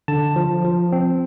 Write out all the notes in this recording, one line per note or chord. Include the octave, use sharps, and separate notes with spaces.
D3 A5
F3
F3
C4